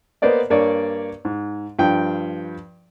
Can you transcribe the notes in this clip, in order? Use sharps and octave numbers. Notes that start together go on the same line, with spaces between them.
A#3 B3 C5 D5 D#5
G2 A#3 C#5 D5
G#2
G2 F3 G5